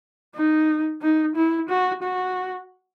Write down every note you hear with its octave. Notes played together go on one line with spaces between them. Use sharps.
D#4
D#4
E4
F#4
F#4